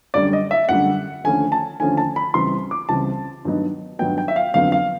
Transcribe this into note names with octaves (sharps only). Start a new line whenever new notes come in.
F#2 D3 G3 D5
D#5
E5
F#2 D3 G3 F#5
D#2 D3 F3 A3 C#4 G#5
A5
D#2 D3 F3 A3 C#4 G#5
A5
B5
C#2 C#3 E3 G3 C4 C6
D6
C#2 C#3 E3 G3 C4 A5
G2 D#3 F#3 B3 D#4
G2 D#3 F#3 B3 D#4 G5
G5
E5
F5
G1 F2 D3 F#3 B3 F5
F5